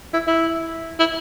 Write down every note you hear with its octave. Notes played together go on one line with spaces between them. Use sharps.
E4
E4
E4